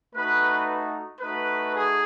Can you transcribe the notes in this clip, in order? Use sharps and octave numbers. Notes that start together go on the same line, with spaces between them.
A3 D#4 F#4 B4
A3 D#4 F#4 B4
G#4